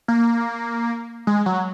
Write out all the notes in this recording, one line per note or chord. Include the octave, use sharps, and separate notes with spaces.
A#3
G#3
F#3